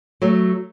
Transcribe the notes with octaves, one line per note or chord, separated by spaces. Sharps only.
F#3 A3